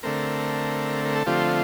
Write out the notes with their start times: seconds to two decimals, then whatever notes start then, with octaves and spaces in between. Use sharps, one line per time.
0.03 D3 A3 C4 A#4
1.05 A#4
1.15 A4
1.26 D3 F3 A3 C4 F4 G4